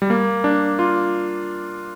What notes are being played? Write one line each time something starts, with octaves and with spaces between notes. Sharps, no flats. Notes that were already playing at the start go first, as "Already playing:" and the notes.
G3
A#3
D4
F4